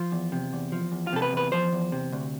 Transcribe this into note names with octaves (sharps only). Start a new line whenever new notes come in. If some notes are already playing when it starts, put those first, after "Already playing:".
Already playing: F3 F4
E2
C3
E2
F3
E2
F4
C3 A4
B4
E2 B4
F3 C5
E2
C3
D2